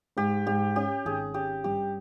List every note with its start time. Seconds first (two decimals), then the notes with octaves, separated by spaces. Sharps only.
0.17 G#2 G4
0.46 G#2 G4
0.76 C#4 G4
1.05 G#1 G#4
1.34 C#4 G4
1.64 G2 G4